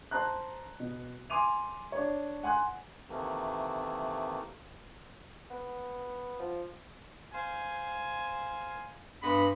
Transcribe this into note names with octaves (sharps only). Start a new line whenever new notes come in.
C5 A5 A#5 F#6
B2
G#5 C6 D6 D#7 F7
D4 C#5
F#5 G#5 C6 F#6
C3 D#3 E3 A3 A#3
B3
F3
C5 F5 G#5
G2 G#3 B3 B5